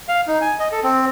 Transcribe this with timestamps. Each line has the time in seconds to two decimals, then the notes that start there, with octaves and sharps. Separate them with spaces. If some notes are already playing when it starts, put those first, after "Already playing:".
0.08 F5
0.27 D#4
0.41 G#5
0.59 D#5
0.72 A4
0.83 C4